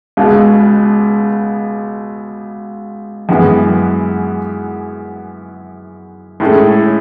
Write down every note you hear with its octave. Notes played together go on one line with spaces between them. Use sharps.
C#2 B2 G#3
F#2 E3 G#3 B3
A2 G#3 C#4 E4 A4